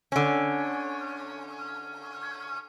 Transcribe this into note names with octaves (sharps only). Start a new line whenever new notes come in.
D3 C#4